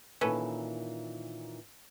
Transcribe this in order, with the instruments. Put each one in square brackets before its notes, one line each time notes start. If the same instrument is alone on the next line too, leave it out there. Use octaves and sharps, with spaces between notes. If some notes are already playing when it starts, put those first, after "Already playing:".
[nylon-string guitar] A#2 D#3 E3 [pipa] C#4 A4 B4